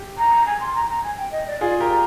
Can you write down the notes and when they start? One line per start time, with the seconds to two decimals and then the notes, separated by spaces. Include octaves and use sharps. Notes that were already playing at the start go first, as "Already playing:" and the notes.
Already playing: G4
0.18 A#5
0.47 G#5
0.61 C6
0.75 A#5
0.89 A#5
1.04 G#5
1.18 G5
1.32 D#5
1.47 D5
1.60 F4 G#4 D5
1.80 G4 A#4
1.90 A#5